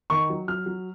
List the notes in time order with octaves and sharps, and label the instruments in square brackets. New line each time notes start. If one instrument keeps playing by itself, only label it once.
[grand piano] D#3 C#6
F#3
F#3 F6
F#3